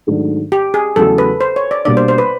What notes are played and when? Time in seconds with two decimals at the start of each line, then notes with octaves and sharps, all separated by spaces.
0.07 G#2 D#3 F#3 A3 D4
0.52 G4
0.74 G#4
0.96 E2 C#3 F#3 A3 A4
1.18 B4
1.41 C5
1.56 C#5
1.71 D5
1.85 B2 G3 A#3 D4 D5
1.97 C5
2.08 C5
2.18 B4